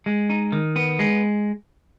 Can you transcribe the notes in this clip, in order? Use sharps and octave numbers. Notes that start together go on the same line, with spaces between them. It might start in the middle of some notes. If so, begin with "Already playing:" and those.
G#3
D#4
D#3
B3
G#3